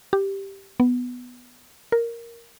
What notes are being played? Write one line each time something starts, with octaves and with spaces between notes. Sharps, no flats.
G4
B3
A#4